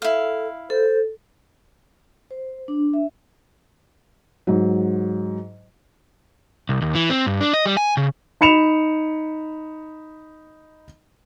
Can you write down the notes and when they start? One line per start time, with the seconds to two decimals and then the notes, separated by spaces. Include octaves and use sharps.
0.02 E4 A4 F5
0.70 A4 C5
2.31 C5
2.68 D4
2.94 E5
4.47 G#2 F#3
6.69 C2
6.82 D#2
6.95 E3
7.10 C4
7.26 G2
7.41 D4
7.54 D#5
7.66 G3
7.77 G#5
7.97 C#3
8.41 D#4 B5 C#7 E7 F7